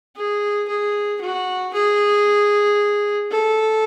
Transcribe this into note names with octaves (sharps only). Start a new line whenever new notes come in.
G#4
G#4
F#4
G#4
A4